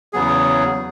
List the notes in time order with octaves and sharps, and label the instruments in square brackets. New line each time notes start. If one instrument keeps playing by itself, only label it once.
[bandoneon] E2 C#3 F#3 B3 G#4